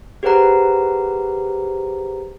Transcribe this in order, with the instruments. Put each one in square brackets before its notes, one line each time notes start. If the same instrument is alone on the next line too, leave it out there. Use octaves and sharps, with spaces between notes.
[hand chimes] G4 G#4 B4 C5 F#5 A#5